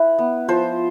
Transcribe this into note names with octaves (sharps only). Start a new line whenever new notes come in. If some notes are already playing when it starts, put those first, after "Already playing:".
Already playing: E4 B4
B3
F3 C5